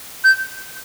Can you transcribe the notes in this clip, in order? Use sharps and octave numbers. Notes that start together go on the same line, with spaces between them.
G6